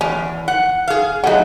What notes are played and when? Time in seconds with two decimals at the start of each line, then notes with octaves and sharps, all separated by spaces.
0.01 E2 C#4
0.48 F#5
0.88 G#4 F5
1.24 F#3 A3 D#4 G#4 F#5